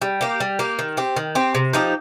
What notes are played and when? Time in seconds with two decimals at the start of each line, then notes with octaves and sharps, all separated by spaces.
0.02 G3
0.21 A#3 G4
0.40 G3
0.59 A#3 G4
0.79 D#3
0.97 C4 G4
1.16 D#3
1.35 C4 G4
1.55 C3
1.73 F3 D#4 G4